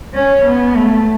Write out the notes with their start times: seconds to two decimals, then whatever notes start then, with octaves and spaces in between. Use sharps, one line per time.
0.14 C#4
0.46 B3
0.76 A3